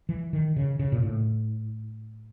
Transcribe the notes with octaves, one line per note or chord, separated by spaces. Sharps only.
E3
D#3
C#3
C#3
A#2
A2